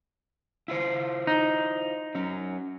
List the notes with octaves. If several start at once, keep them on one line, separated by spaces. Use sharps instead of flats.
E4 F4 C5
D#4
F#3 C#4